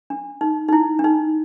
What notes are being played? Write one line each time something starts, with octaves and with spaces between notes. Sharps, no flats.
D4
D#4
D#4
E4
D4
D#4